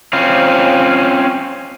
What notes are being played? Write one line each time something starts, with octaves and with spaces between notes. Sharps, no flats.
C4 C#4 F4